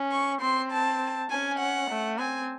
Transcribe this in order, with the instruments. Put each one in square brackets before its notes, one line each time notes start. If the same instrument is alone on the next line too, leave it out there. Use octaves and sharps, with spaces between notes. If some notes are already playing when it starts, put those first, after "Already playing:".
Already playing: [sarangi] C#4
[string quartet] C#6
[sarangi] C4 [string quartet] C6
[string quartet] A5
[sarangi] C#4 [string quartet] G#5
[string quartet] F#5
[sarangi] A3
[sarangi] C4 [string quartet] G#5